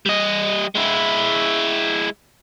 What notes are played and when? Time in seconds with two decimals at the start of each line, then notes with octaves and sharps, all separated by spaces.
0.06 G3 D#5
0.75 G#3 E4